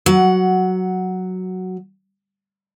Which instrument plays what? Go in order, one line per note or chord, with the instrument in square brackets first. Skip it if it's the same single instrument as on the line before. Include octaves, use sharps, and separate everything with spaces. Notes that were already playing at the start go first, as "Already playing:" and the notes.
[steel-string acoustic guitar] F#3 F#5